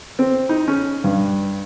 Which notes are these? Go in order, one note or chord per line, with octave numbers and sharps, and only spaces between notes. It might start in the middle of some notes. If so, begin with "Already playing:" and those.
C4
D#4
C#4
G2